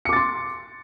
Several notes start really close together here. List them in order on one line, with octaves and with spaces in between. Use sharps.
C#7 D6 A6 C6